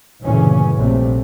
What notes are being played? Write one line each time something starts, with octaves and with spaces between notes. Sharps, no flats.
D2 G2 A#2 C#3 E3 C#4
A#1 C3 G3 A3 C4